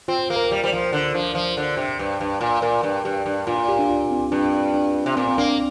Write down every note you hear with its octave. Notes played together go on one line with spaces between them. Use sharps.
C4 F4
A#3
A#4
G3
G3 C5
F3
D3
F3
F3
D3
C3
G2
G2
A#2
A#2 A#4
G2
G2 G4
G2
A#2 F4
F4
G4
D4
F4
C4
G2 D4
D4
C3
A#2 C4
C4
A#3 D4